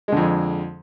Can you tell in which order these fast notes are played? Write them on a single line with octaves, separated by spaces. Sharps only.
G#3 D3 F2